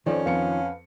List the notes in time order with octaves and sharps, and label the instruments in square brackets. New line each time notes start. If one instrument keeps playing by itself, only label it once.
[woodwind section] F2 [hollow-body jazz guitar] D#3 F3 D#4 [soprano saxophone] C#4 [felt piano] C5 D5
[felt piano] F2 C#7 [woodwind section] B3 B4 F5